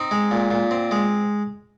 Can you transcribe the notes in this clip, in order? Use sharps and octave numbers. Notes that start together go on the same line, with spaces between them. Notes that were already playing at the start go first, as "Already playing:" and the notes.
Already playing: C4 D#4
G#3
A#2
A#2
C4
G#3